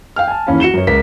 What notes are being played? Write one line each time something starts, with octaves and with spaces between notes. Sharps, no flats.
F5 G5 F6
G#5 A5
D#2 E3 C#4 F5 B5
F#4 C#7 E7 G7
F#2 C#5
C#2 A#4 B6